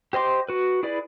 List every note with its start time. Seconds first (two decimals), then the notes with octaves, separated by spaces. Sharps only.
0.13 G4 C5 D#5 C6 D6
0.49 F#4 B4
0.83 E4 G#4 B4 D5